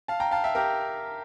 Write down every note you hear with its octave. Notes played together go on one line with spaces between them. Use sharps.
F5 A5
G5 A#5
F5 A5
E5 G5
G4 A#4